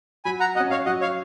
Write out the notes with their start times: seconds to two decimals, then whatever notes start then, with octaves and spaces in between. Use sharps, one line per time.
0.25 F#3 G#5 B5
0.40 F#5 A#5
0.55 F#4 D#5 F#5
0.60 C#4
0.70 C#5 F5
0.86 F#3 D#5 F#5
1.01 C#5 F5